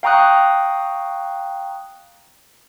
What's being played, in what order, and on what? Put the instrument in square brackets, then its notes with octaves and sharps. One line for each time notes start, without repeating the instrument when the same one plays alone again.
[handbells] F5 G5 A#5 C#6 D#6 F#6